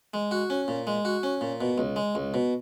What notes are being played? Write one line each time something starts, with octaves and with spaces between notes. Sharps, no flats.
G#3
F#4
C#4
A#2
G#3
F#4
C#4
A#2
B2
C#2
G#3
C#2
B2